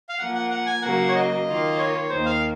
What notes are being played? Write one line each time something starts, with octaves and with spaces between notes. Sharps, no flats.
F5
F3 A#3 F4 A#4 F#5
F#5
F#5
G#5
C#3 F#3 A#3 F#5
C#5
D#5
D#3 A#3 F4
C#5
D#2 D#3 A#3 C5
F5